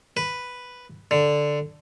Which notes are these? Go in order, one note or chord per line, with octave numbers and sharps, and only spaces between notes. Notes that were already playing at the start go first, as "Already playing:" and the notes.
B4
D3